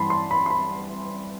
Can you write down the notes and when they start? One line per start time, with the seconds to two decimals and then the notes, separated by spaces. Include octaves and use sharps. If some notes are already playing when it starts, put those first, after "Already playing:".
Already playing: G2 E3 A5 B5 C6
0.10 C6
0.31 B5
0.46 C6
0.50 B5